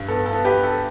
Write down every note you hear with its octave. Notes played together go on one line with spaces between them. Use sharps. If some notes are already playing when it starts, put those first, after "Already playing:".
Already playing: G2
B3 A4
A4
B3
G4 B4
B3
A4